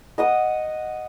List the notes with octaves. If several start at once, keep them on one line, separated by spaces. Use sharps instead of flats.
D#5 F#5 D#6